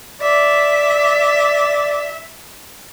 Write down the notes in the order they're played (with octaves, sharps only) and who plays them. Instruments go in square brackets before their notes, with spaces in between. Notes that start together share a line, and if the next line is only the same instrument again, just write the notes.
[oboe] D5 [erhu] E5